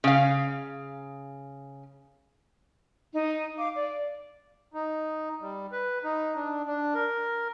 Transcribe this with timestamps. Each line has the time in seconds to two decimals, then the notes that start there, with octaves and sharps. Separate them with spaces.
0.04 C#3 F5
3.13 D#4
3.58 F5 D6
3.75 D5
4.74 D#4
5.41 G3
5.72 B4
6.04 D#4
6.36 D4
6.67 D4
6.95 A#4